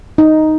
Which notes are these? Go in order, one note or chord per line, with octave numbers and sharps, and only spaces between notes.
D#4